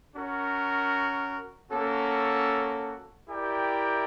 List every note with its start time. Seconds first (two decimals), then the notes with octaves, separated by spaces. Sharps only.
0.15 C#4 F#4 A#4
1.71 A#3 C#4 F#4 A4
3.28 E4 G4 A#4 D5 G5